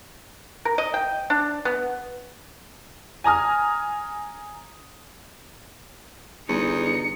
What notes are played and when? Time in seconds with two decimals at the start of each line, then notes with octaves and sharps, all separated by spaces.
0.65 A#4
0.78 D#5
0.94 G5
1.30 D4
1.65 B3
3.24 G#5 A#5 D#6 F6
6.49 G1 E2 D#4 C#7